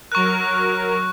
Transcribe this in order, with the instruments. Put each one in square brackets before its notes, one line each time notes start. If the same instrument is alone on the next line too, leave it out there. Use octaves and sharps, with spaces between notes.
[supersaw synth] F#3 A#4 [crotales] C#6 F#6